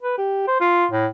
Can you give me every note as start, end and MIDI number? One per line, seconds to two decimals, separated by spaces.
0.03 0.17 71
0.18 0.47 67
0.47 0.57 72
0.60 0.86 65
0.91 1.07 45